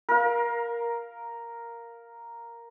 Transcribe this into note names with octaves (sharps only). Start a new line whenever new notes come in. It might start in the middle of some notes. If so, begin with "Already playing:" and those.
A#4 F5